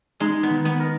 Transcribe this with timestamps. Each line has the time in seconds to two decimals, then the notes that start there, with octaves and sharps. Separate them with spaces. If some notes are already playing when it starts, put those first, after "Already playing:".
0.20 G#3 D#4
0.43 B3
0.51 D#3
0.65 B3
0.80 A#4